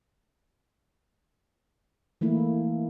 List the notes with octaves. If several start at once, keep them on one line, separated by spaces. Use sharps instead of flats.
E3 A3 A#3 E4